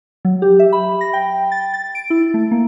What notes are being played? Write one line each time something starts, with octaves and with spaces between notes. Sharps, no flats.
F#3
G4
E5
B5
A#6
G5
A6
A6
D7
E4
A3
A#3